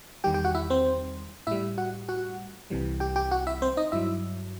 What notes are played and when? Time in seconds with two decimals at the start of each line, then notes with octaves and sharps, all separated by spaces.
0.24 E2 D#3 G3 G4 G5
0.34 G4 G5
0.45 F#4 F#5
0.55 E4 E5
0.70 C4 C5
1.47 A2 G3 E4 E5
1.78 F#4 F#5
2.09 F#4 F#5
2.70 C2 C3 E3 G3
3.00 G4 G5
3.16 G4 G5
3.31 F#4 F#5
3.47 E4 E5
3.62 C4 C5
3.77 D#4 D#5
3.92 G2 F#3 E4 E5